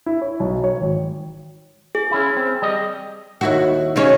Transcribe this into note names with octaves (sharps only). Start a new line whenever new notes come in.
E4
C#5
B1
C#5
G#1
G#4
C#4 E4
C4
G3 D#5
D#2 E4 F#4
C#3 F#3 C#4 D#4 C#5